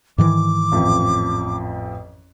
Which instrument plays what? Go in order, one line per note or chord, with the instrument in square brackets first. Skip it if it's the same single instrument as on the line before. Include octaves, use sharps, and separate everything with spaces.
[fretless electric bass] G#2 D#3 E3 [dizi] D6
[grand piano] A1 F2 F3